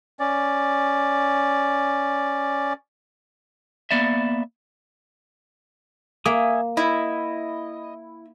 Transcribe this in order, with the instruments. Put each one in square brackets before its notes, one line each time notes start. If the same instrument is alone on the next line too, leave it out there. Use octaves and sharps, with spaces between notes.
[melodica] C#4 D5
[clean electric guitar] A#3 B3 D5 E5
[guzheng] A#3 [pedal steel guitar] E5 G#5 D#6
[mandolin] E4 [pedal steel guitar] D#5